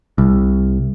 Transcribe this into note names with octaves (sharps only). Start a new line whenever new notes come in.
C2